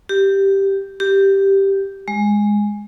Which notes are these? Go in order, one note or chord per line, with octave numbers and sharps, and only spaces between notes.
G4
G4
G#3